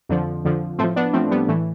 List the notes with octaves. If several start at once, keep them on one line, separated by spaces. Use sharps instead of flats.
F2 D3 F3
F2 D3 F3
A2 F3 A3 C4
B3 D4
A2 F3 A3 C4
G3 B3
A2 E3 A3